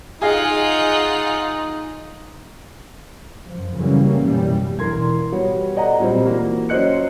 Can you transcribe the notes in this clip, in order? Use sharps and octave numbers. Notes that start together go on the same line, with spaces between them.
D#4 F4 G#4 D#5 F5 F#5
F#2 F3
C#3 E3 F#3 G3 A#3 C#4
F#2 B2 E3 G3
E1 E3 A#4 C6 G#6
G3 B3 F#4 C#5
A4 D5 D#5 F#5 A#5
A#2 F#3 G3 C4
E3 A#3 F#4
F#3 C#4 C5 D#5 F#6 C#7